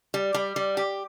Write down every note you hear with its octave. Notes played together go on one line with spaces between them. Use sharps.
G3
G3
G3
G4